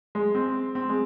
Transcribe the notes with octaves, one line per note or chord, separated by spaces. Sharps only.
G#3
C4
C4
G#3